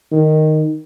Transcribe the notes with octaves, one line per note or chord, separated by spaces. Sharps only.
D#3